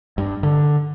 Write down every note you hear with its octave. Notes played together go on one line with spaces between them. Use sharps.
G2
D3